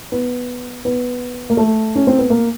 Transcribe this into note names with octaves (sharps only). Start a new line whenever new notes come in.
B3
B3
A#3
A3
C#4
C4
B3
A#3